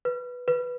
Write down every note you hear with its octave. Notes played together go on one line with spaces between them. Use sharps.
B4
B4